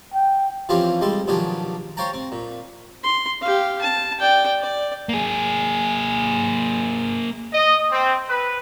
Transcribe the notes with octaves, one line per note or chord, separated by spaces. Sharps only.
G5
E3 F3 C4 C#4 F4 G4
G3 G#3 C4 A4
B1 D#3 F3 D4 G4 G#5
C5 C#5 F5 G5 A5 A#5
C4
A#2
C6
G4 F5
A5
D5 G5
D5
A#3 G#4
D#5
C4
B4